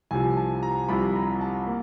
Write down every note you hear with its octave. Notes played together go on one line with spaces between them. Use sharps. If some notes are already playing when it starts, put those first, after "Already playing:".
C2 C3 F3 G#5
A5
A#5
C2 C3 F3 B5
A#5
A5
A#3